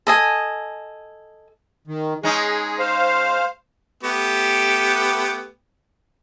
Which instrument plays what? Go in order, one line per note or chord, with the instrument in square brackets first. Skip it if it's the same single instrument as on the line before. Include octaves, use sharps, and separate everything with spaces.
[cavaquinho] A4 D#5 G#5
[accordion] D#3
[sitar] G#3 C#4 D#4 [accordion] G#4
[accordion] C5 F5
[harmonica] A3 B3 G4